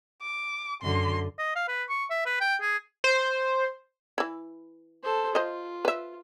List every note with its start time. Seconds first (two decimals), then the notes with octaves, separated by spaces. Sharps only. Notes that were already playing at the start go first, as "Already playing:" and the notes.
0.22 D6
0.82 F#2 D3 C6
1.39 D#5
1.56 F5
1.68 B4
1.89 C#6
2.10 E5
2.26 B4
2.41 G5
2.61 G#4
3.04 C5
4.18 E3 E4
5.03 A4 C5
5.35 F4 C5 D#5
5.85 B4 E5